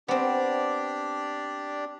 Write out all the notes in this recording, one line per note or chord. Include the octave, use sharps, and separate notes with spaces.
B3 C4 D4 G4 D5